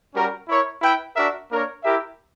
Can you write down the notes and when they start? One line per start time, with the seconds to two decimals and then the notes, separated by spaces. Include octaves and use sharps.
0.15 G3 C#4 F#4 A#4
0.48 E4 A#4 C#5
0.81 E4 B4 E5 G5
1.16 D4 F#4 A#4 E5
1.49 A#3 D4 A#4 C#5
1.83 E4 G4 A#4 E5